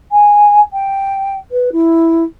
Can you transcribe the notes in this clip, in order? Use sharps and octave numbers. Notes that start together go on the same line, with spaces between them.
G#5
G5
B4
E4